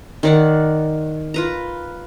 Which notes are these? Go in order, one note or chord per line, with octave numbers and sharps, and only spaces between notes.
D#3 D5 F#5
F4 B4 A#5